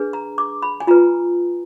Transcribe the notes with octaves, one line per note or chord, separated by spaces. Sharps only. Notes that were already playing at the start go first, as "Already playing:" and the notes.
Already playing: D4 G#4 B4
A#5
D6
B5
G#5
F4 B4 A#5